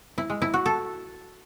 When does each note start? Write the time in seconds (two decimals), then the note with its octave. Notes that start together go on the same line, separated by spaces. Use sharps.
0.18 E4
0.30 G#3
0.42 E4
0.54 F#4
0.66 A4